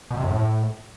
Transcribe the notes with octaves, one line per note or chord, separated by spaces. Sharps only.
B2
C3
F#2
A2